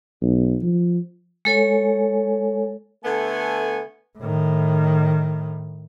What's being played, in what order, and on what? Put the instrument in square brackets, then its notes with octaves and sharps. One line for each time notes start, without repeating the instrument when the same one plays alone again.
[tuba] B1
F3
[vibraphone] G#3 A4 C#5 G#5
[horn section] D3 A3 B3 G#5
[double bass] A2 D#3